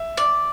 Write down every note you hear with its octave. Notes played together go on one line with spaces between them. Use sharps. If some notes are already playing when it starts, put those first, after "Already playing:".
Already playing: E5
D5